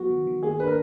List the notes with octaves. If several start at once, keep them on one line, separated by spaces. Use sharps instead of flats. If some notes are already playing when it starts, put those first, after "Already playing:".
Already playing: F#3 B3 F#4
D#3
D#3
A#3 G#4
D4 B4
A#4